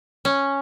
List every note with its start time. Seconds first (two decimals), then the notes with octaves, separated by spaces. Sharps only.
0.25 C#4